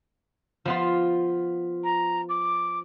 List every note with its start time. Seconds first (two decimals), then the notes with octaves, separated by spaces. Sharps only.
0.65 F3 B3 F4
1.84 A#5
2.29 D6